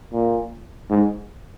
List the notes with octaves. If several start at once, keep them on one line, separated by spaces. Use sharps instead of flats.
A#2
G#2